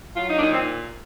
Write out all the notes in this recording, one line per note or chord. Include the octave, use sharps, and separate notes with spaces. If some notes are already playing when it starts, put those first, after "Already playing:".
F#3 F4
D#4
A#2 D4
D#4
C4